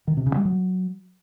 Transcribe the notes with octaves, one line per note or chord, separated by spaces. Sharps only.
D#3
C3
C#3
G3
F#3